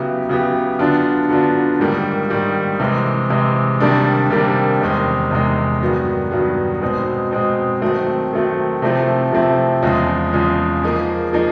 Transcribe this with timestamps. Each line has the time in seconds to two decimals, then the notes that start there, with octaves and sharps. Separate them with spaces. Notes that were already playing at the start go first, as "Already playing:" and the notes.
Already playing: C#3 F#3 B3 E4 G4
0.29 C#3 F#3 B3 E4 G4
0.79 D3 F#3 B3 D4 F4
1.29 D3 F#3 B3 D4 F4
1.79 G#2 D#3 G3 A#3
2.30 G#2 D#3 G3 A#3
2.80 C3 E3 G#3
3.30 C3 E3 G#3
3.80 C3 D#3 G3 A#3 D4
4.30 C3 D#3 G3 A#3 D4
4.81 E2 C3 D#3 G#3
5.31 E2 C3 D#3 G#3
5.81 G2 D#3 F#3 B3
6.31 G2 D#3 F#3 B3
6.82 B2 G#3 C4 D#4
7.31 B2 G#3 C4 D#4
7.82 D#3 F#3 A3 C4
8.32 D#3 F#3 A3 C4
8.82 C3 F3 A3 C4 E4
9.32 C3 F3 A3 C4 E4
9.83 E2 C#3 F3 G#3
10.33 E2 C#3 F3 G#3
10.83 F3 A#3 D#4 G#4
11.33 F3 A#3 D#4 G#4